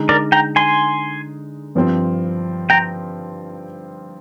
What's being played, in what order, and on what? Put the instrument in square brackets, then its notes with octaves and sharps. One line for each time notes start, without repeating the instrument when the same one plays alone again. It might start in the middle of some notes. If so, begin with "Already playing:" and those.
Already playing: [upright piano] D3 G#3 D#4
[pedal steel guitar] A#4 D5
G5 A#5
G#5 C6
[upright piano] G2 F3 C4
[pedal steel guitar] G5 A#5